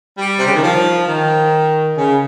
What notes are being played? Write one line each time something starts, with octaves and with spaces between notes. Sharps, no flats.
G3
C3
C#3
D#3
F3
D#3
C#3